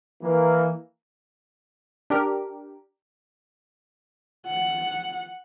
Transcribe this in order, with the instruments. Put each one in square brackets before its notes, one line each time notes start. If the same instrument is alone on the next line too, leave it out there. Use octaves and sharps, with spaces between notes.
[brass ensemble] E3 A#3
[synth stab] D4 G4 A#4
[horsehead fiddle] F#5